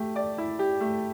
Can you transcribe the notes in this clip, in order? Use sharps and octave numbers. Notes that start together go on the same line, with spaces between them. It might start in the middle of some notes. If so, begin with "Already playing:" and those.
Already playing: A3 G4
D5
E4
G4
A3